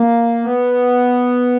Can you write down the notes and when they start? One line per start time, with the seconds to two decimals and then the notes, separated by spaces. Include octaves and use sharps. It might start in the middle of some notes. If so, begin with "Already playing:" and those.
Already playing: A#3
0.44 B3